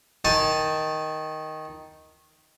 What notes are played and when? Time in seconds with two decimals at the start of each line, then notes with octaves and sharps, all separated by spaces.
0.25 D#3 G#5 A5